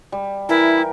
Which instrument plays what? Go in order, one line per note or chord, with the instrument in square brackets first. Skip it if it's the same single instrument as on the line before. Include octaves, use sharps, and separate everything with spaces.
[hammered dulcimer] G3
[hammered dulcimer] E3 A#4 [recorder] E4
[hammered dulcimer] G4